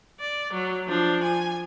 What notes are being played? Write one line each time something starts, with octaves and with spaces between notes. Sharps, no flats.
D5
F#3
F3 D4
G#5